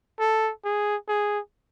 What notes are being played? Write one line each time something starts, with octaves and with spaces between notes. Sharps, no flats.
A4
G#4
G#4